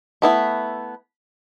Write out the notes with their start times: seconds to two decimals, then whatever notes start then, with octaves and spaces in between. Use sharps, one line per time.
0.22 A3 B3 E4